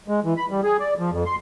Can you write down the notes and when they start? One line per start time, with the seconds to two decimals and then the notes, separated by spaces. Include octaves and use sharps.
0.08 G#3
0.25 E3
0.37 B5
0.51 G3
0.64 G#4
0.80 D5
0.99 F3
1.11 F2
1.26 C6